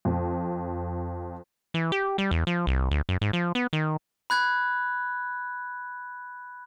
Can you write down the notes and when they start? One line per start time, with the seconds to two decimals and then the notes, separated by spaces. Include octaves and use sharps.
0.05 F2
1.74 E3
1.92 G4
2.18 G3
2.31 E2
2.47 F3
2.67 C2
2.91 D2
3.09 F#2
3.21 G#2
3.33 F3
3.55 B3
3.73 D#3
4.30 B5 F#6 G#6